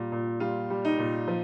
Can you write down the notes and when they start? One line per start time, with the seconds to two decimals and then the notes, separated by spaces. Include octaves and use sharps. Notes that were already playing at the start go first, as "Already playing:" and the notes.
Already playing: A#2 G3
0.12 A#2
0.40 G3 F4
0.70 G3
0.85 D#4
0.99 A#2
1.28 F3